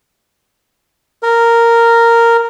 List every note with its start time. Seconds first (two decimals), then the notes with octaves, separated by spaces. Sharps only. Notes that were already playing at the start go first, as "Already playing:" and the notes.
1.23 A#4